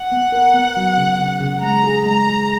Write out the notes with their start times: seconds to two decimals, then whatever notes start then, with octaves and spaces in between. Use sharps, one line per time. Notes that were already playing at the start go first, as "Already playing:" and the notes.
Already playing: F#5
0.12 B3
0.32 A#4
0.54 B3
0.76 F#3
0.97 C#3
1.20 C#3
1.41 C#3
1.63 G#3 A#5
1.84 G#4
2.06 G#3 A#5
2.27 G#3